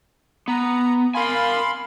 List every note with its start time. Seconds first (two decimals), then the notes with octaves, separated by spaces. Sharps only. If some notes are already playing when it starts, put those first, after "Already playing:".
0.48 B3 A#5
1.15 A#4 F5 G#5 B5 C6